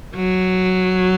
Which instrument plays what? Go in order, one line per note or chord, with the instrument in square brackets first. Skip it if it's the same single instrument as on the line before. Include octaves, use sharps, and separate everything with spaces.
[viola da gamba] F#3